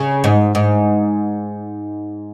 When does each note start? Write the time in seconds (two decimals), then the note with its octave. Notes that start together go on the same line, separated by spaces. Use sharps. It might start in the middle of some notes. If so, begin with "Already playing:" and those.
Already playing: C#3
0.24 G#2
0.55 G#2